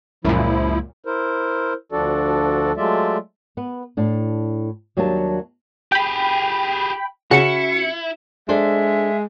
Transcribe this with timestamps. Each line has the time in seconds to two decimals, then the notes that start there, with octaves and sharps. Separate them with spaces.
0.25 C#2 F#2 A#2 F3 G#3 A#3 E4
1.05 E4 A#4 C5
1.92 D2 F3 D4 F#4 A4 D5
2.77 F#3 G#3 A3 F4 D5 E5
3.57 B3 B4
3.97 A2 D4
4.97 D#2 F#3 G3 A#3 D4 A5
5.92 G4 G#4 G5 B5
7.31 C#3 C#4 E4 F#4 F#5 C#7
8.49 G#3 D4 A4 C5 E5